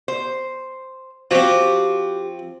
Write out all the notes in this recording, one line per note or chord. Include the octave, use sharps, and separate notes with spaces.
C5
F3 C4 F#4 G4